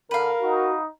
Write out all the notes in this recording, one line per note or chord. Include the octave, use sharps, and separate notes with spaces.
D3 A#4 B4 F5
D#4 F#4